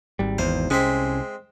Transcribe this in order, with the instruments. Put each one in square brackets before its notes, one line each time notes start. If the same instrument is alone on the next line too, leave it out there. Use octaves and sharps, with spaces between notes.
[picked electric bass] G#1 G3
[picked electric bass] G#1 E2 [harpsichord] C5
[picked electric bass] C2 C#4 [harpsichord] G#3 C4 E5